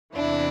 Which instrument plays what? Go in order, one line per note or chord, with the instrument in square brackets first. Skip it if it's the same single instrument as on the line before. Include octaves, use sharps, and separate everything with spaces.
[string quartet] E2 C3 E3 D4 E4